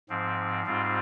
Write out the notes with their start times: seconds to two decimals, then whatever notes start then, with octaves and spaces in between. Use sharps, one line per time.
0.09 G#2 F3 C4
0.66 G#2 G3 C4 F4